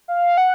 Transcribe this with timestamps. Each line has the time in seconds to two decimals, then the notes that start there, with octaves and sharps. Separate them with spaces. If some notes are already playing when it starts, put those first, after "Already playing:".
0.08 F5
0.38 F#5